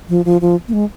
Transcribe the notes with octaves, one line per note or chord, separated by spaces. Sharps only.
F3
F3
F3
A#3
G#3